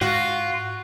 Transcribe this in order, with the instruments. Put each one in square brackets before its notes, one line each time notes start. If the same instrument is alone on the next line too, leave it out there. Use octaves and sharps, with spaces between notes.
[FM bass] G#2 [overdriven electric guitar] F4 [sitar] F#4